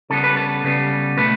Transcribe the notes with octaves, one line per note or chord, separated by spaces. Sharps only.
C#3 G3 B3 A4
B4
A4
C#3 G3 B3
B2 A3 B4